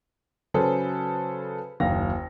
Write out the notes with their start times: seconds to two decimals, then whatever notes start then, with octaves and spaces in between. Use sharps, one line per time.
0.54 C#3 F#3 G#4 A4 B4 C5
1.80 F#1 D#2 F5 A#6